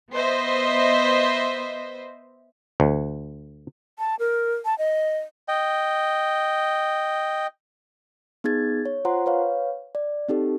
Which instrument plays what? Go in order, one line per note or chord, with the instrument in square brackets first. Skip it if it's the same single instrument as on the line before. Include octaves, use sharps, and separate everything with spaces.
[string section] B3 C5 D#5 E5
[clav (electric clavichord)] D2
[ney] A5
A#4
A5
D#5
[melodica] D#5 G5
[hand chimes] B3 D#4 G#4 G#6 A6
C#5
F4 C5 F#5 A#5 C6
B4 C#5 F5
D5
C4 D#4 G4 A4